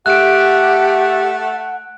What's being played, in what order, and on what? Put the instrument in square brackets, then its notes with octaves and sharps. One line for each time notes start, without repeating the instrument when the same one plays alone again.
[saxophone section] A3 [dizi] G4 [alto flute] F#5 [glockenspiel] F#6 D7